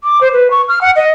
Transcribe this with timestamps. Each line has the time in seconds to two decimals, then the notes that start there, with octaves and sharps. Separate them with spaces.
0.04 D6
0.21 C5
0.33 B4
0.51 C#6
0.69 F6
0.81 F#5
0.96 D#5